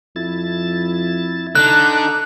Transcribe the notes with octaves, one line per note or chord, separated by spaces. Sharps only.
F2 E4 A6
D3 D4 D#4 A#5 D6 F#6